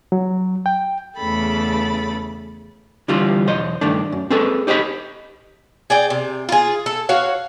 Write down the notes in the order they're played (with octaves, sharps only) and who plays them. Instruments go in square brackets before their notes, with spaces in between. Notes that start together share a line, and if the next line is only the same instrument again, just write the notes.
[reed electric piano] F#3
G5
[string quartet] E2 C#3 A3 A4 B5 A6
[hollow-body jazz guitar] D3 E3 G3 C4 F4
B1 E2 C5 D#5
G2 D#3 A3 D4
F#2
C4 G#4 A4 B4
D#4 G4 C5 D#5 F#5 B5
[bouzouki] G#4 D5 G5
C3
F4 G#4
A4
F#4 C#5 F5